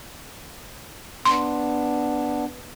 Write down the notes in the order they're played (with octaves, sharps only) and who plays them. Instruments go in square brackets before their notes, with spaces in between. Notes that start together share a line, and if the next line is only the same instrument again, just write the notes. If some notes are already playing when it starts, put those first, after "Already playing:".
[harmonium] B3 D4 [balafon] C6